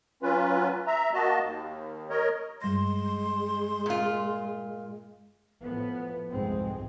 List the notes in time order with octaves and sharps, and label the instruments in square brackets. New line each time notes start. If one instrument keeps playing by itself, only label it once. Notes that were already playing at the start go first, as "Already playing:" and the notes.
[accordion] F#3 C#4 F4 B4
E5 A#5
A#3 F#4 D#5 A5
D#2
A#4 C#5 D#5
[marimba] G2 G3 A#6 [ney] G#3 [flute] C6
[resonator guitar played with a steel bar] A#2 F4
[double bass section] A2 F3 B3
C2 F2 G#2 G#3 C4